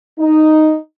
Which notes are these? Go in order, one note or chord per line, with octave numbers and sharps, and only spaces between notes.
D#4